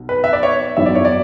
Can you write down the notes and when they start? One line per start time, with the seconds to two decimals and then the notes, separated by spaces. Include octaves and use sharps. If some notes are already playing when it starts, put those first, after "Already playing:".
Already playing: B1 B2 F#3
0.09 B4
0.24 E5
0.33 D5
0.43 C#5
0.77 G#1 F#2 E3 B3 E5
0.86 D5
0.95 C#5
1.05 D5